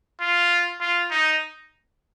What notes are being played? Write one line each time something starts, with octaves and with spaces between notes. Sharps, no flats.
F4
F4
D#4